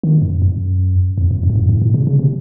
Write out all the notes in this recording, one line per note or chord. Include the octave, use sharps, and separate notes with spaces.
D#3
F#2
F#2
F2
F#2
F#2
A2
F#2
A2
A#2
C#3
C#3
C3